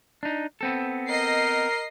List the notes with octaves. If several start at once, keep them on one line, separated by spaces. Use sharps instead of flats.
D4 D#4
B3 C4 A4
A#4 D#5 C7